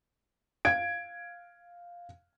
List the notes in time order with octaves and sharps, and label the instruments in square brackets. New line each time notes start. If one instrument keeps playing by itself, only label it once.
[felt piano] F5 G#6 D7